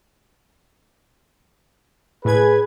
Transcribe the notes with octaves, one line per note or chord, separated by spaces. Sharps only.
A2 G#4 B4 G#6